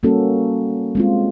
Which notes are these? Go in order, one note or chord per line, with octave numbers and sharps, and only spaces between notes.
G3 A#3 C#4 F#4 A4
G#3 C4 F4